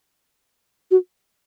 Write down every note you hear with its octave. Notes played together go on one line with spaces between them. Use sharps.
F#4